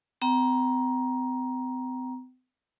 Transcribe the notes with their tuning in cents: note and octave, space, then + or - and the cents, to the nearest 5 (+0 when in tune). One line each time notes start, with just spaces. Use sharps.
C4 -45 G5 -30 A#5 +15